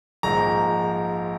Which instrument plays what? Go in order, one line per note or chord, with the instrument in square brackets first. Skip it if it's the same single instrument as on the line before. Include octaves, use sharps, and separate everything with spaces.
[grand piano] A#1 G#2 F3 A#5